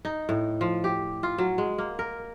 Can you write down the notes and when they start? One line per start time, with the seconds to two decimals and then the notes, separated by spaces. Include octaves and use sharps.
0.05 D#4
0.29 A2
0.61 F3
0.84 G4
1.23 F4
1.38 F#3
1.58 G#3
1.78 A#3
1.99 A#4